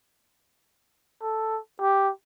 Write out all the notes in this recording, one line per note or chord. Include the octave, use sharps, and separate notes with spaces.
A4
G4